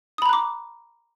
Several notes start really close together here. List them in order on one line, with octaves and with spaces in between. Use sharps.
D#6 B5 A#5 F#6 D6